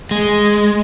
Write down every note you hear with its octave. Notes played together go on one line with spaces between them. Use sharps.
G#3